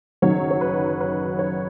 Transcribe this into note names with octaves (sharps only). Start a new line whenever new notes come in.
F#1 F#2 D#3 F#3 C#5
C#5
B4
B4
C#5